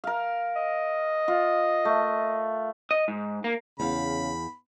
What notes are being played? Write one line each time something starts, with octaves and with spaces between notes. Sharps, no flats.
A#4 F5
D#5
F4
A3
D#5
G#2
A#3
E2 C#3 F5 B5